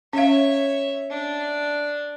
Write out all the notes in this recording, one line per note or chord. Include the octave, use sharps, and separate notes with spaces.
C#4 C#5 E5 F5
D4